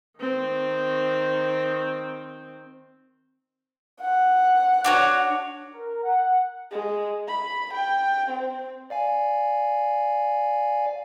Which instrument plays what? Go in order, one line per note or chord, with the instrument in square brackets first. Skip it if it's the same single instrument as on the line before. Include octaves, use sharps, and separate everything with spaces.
[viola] D#3 C4
[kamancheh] F#5
[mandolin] D4 F#4 C#5
[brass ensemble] A#4
F#5
[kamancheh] G#3
B5
G5
C4
[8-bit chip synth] D5 F5 G#5